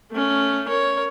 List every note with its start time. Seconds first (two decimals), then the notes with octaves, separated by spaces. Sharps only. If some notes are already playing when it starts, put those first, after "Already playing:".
0.12 A3 C#4
0.68 A#4 C#5